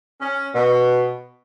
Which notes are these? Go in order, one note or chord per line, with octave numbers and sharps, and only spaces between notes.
C#4
B2